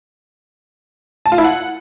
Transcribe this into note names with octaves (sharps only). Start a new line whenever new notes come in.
A5
F4
E4
F#5